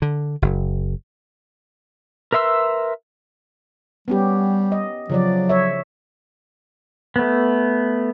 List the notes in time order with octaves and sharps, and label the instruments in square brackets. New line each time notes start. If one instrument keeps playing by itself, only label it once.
[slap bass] D3
F#1
[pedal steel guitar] A#4 B4 E5 C6 E6
[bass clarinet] G3 [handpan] B3 C#4 G4
[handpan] D#5
[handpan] C#3 F3 D5 [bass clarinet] F#3
[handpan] C#5 E5
[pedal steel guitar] A3 B3